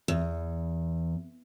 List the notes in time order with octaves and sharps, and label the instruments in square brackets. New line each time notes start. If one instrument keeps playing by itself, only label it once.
[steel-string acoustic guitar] E2